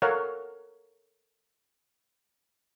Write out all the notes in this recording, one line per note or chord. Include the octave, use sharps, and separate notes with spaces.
A4 A#4 C#5 F5 F#5